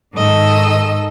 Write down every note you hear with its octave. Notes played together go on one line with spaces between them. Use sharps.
G#2 D#3 A4 D#5 E6